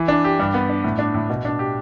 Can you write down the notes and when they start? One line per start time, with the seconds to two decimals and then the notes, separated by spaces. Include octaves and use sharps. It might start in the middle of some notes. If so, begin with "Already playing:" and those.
Already playing: E3
0.08 D4
0.24 G4
0.39 G2
0.54 B3
0.69 D4
0.84 A2
0.99 D4
1.14 A2
1.30 B2
1.45 D4
1.59 G4